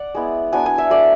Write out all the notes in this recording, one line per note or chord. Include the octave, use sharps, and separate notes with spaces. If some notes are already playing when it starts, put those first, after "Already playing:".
Already playing: D5 F#5
G#3 B3 E4
F#3 B3 D4 G#5
G#5
E5
F#3 A3 D4 D5